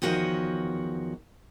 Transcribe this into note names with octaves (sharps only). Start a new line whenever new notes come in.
E2 D#3 F3 F#4 C#5 D#5